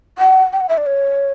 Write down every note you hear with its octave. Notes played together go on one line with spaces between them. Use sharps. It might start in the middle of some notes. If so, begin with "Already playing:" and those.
F#5
G5
F#5
E5
D5
C#5